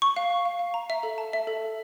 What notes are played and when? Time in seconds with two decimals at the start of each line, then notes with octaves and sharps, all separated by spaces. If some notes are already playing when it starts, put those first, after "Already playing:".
0.02 C#6
0.16 F5
0.30 F5
0.46 F5
0.59 F5
0.74 A#5
0.90 E5
1.03 A4
1.18 A5
1.33 E5
1.47 A4
1.62 A4